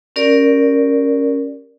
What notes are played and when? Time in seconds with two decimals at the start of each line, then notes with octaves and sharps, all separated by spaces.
0.16 C#4 G4 A#4 D5